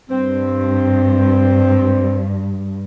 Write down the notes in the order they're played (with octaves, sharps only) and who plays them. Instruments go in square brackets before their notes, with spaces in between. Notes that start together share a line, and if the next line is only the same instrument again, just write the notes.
[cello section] G2 [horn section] C4